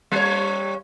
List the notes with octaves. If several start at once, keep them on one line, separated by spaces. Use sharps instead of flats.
G3 C#5